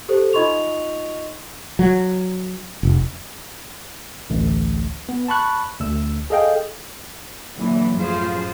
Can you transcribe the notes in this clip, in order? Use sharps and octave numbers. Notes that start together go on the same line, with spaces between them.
G4 A4 C5
D#4 F4 D#5 C6 C#6 F7
F#3
F1
A1 D2
B3
A5 B5 C#6 F#6
D2 E6
G#4 A4 D#5 F5 G5
A#2 D3 E3 F#3
F#2 A2 F3 F4 G#4 C5